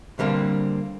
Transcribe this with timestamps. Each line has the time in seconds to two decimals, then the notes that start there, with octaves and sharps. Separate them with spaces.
0.19 D3 G3 A#3 C4